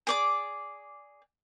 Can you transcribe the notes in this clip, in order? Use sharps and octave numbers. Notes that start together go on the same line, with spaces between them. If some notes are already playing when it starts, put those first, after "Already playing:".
G#4 D5 D6